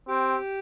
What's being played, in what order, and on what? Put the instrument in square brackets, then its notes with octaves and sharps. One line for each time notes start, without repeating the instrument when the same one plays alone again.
[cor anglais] C4 [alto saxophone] G4